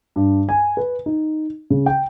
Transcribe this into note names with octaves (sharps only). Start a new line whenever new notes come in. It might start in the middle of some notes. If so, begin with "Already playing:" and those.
G2
G#5
B4
D#4
C#3
G5